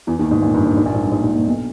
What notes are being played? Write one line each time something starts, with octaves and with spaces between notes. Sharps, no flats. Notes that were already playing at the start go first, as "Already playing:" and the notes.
E2 E3
D#2 D#3
G#2
A#1 A#2
G2
G#2
G#2
A#1 A#2
G#2
G2
G#2
G#2
A#1 A#2
B1 B2